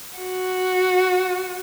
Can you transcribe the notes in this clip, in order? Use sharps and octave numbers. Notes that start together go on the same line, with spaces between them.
F#4